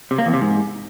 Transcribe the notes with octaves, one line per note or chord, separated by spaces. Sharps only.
C3
A#3
E2
C3
G#2